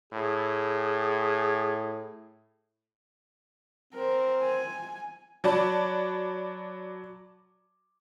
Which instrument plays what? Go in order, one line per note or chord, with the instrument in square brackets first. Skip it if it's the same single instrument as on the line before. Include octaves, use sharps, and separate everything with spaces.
[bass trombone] A2 [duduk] G#4
[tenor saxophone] C4 [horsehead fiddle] A#4
[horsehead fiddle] G#5
[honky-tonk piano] F#3 D5 A5 B5